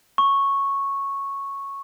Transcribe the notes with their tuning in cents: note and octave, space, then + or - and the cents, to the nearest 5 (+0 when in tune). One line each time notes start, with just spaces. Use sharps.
C#6 -5